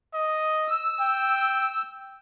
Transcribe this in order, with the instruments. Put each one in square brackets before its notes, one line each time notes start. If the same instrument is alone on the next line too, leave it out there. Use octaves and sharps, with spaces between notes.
[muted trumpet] D#5
[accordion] E6
[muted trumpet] G5